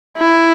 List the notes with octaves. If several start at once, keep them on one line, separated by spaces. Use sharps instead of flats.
E4